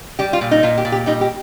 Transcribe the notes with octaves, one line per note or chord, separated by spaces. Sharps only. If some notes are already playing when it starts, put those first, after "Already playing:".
G3 G4
F4
A#2
D#4
A#2 F4
G4
A#2
G4
G3 D#4
G4